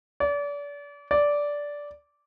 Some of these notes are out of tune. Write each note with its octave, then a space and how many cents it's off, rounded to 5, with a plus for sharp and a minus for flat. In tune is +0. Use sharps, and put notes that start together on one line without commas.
D5 -35
D5 -10